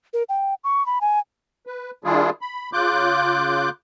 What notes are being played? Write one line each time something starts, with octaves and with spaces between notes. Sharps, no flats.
A#4
G5
C#6
B5
G#5
B4
D#3 G3 D4 E4 F4 G#4
B5
C#3 F4 D6 F#6 G6